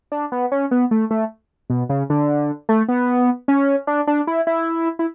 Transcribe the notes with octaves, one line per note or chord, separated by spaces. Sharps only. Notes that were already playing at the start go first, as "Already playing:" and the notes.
D4
B3
C#4
B3
A3
A3
B2
C#3
D3
A3
B3
C#4
D4
D4
E4
E4
E4